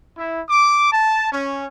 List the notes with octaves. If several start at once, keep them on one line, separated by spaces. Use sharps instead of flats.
E4
D6
A5
C#4